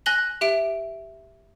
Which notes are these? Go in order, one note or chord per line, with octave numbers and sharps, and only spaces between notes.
G#5 F#6 A#6 F#7 G7
G4 E5 D7